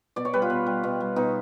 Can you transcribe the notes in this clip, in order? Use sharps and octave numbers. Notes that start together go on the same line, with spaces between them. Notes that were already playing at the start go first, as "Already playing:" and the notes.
B2 D5
C#5
G3 B4
F4
B2
G3
B2
G3
B2 D#4